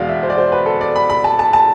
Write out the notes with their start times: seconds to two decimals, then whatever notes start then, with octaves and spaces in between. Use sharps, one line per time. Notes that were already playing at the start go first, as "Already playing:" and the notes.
Already playing: E2 B2 G#3 D5 F5
0.08 E5
0.23 C5
0.30 D5
0.38 C5
0.52 B4
0.66 A4
0.81 D5
0.96 B5
1.10 B5
1.24 A5
1.39 A5
1.53 A5